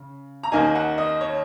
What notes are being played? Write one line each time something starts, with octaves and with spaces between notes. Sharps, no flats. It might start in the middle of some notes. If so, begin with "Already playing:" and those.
Already playing: C#3
A#5
D#2 D#3 A#3 D#4 G#5
F#5
D#5
C#5